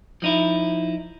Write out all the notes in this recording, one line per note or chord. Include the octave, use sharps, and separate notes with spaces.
F3 D#4 E4